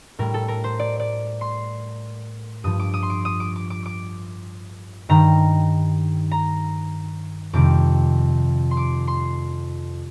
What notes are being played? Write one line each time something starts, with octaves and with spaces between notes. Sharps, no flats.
A2 G3 A#4
A4
A#4
C5
D5
D5
C6
G2 F3 D#6
D6
D#6
C6
D6
D#6
D6
D6
D6
D6
G2 D#3 G3 A#5
A#5
F2 C3 D#3 G3 D6
C6
D6
C6